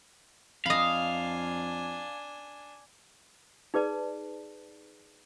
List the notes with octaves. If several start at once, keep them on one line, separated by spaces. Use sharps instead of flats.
F2 D4 D#5 F5 G#5 B5
D#4 G#4 B4 D5 A5